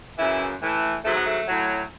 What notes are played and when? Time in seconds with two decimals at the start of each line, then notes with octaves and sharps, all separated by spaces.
0.18 F#2 C#3 E3 E4
0.61 A2 E3
1.04 G#2 F#3 A3
1.15 B3
1.25 A3
1.47 A2 F#3